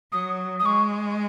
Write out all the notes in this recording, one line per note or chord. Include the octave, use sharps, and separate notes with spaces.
F#3 D#6
D#6
G#3 C#6